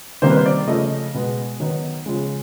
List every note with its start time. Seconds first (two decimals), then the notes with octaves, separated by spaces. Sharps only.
0.22 C3 D#3 G3 A#3 C5
0.30 B4
0.37 C5
0.46 D5
0.68 C#3 F3 A3 D#5
1.14 B2 G#3 B3
1.60 D#3 F#3 B3
2.06 C#3 F3 G#3